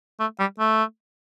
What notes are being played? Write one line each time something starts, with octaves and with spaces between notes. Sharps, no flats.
A3
G3
A3